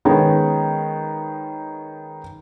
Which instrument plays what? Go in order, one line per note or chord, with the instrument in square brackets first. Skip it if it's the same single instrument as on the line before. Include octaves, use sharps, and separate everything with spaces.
[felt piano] D#3 G#3 B3 C#4